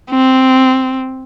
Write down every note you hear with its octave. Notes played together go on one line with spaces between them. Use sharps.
C4